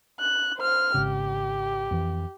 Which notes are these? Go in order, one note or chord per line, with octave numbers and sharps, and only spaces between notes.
F#6
C5 F6
G#1 C#3 G4
F2 E3